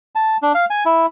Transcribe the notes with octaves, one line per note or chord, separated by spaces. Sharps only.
A5
D4
F5
G#5
E4